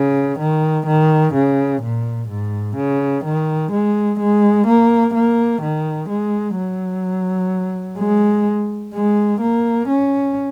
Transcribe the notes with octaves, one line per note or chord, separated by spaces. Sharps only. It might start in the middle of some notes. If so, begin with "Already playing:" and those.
Already playing: C#3
D#3
D#3
C#3
A#2
G#2
C#3
D#3
G#3
G#3
A#3
A#3
D#3
G#3
F#3
G#3
G#3
A#3
C#4